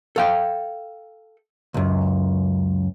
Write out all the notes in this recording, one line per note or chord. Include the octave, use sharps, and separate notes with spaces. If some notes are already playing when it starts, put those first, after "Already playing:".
A4 F5 G5
C#2 F#2